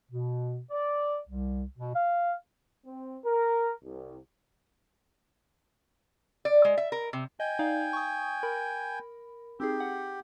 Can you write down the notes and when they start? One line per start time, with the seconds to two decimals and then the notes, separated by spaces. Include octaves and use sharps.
0.11 B2
0.70 D5
1.28 C2
1.77 B2
1.95 F5
2.85 C4
3.25 A#4
3.84 C2
6.45 D5
6.65 G#3
6.77 E5
6.92 A#4
7.13 C3
7.40 D#5 G5 G#5
7.59 D#4 D5 F5
7.93 C#6 D#6
8.43 A#4 B5
9.60 C4 D#4 G4 G#4
9.80 F#5